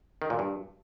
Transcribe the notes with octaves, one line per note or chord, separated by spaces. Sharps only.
D#3
A#2
G2